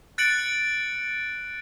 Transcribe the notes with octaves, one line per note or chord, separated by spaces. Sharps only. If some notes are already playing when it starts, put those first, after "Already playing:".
F#6 A6 C#7 D7 F#7